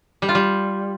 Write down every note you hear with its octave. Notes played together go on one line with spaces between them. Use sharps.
G3
F4
G3